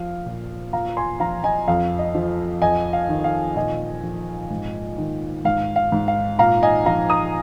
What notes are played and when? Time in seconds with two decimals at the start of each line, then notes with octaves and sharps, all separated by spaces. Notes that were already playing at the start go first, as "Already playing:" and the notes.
Already playing: F3 F5
0.26 A#2
0.73 A#2 F5 A#5
0.97 G#5 C6
1.20 F3 F5 A#5
1.44 D#5 G#5
1.68 F2 F5
1.99 D#5
2.15 F3
2.62 F2 D#5 G#5
2.93 F5
3.09 D#3
3.24 F5
3.56 A#2 D#5 G#5
4.03 F3
4.50 G#2
4.97 D#3
5.45 G#2 F5
5.76 F5
5.92 G#2
6.08 F5
6.39 A#2 F5 A#5
6.63 D#5 G#5
6.86 F3 F5 A#5
7.10 A#5 D#6